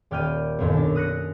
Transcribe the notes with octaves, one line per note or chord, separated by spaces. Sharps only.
D#1 D5 G5 F6 G6 D#7
B1 F#2 A#2 D#3
D4 A5
D#6 F#6 A#6 C#7